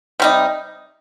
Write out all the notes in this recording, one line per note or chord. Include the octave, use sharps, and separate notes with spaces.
C3 G3 D#4